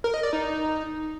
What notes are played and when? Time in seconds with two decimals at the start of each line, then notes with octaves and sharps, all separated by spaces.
0.04 A#4
0.14 D#5
0.23 D5
0.33 D#4